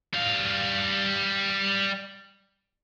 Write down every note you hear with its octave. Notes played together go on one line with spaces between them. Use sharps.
G3 F5